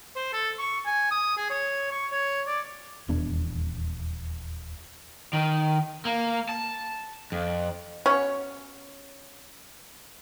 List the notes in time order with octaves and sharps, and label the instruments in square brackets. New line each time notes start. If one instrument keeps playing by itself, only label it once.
[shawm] C5
A4
C#6
G#5
D#6
G#4
C#5
C#6
C#5
D5
[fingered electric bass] D#1 E2 B3 D4
[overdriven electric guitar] D#3
A#3
A5
F2
[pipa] B3 C#4 F#4 C#5